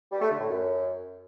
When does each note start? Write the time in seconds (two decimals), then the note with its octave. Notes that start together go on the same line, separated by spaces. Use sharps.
0.11 G3
0.21 A3
0.30 D3
0.39 A2
0.49 F#2